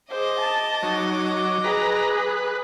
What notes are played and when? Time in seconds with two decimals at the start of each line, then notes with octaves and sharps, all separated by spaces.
0.10 G#4 C5 D#5 D6
0.40 A5
0.83 F#3 D#4
1.64 G#4 B4 A#5
2.10 B4